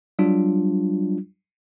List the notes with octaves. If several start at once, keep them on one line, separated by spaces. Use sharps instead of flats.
F#3 G3 D4 F4